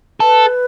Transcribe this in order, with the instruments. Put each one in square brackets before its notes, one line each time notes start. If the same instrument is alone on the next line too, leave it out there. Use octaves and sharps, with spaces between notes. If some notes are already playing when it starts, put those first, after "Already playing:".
[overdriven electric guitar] A4 [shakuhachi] B4